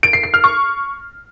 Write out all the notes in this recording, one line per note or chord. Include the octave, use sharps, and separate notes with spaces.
D7
C7
C7
F6
C#6